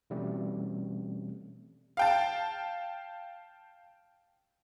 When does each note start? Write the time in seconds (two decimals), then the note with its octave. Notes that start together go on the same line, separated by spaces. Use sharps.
0.10 B2 E3 G3 A3 C4 C#4
1.97 F5 G5 A5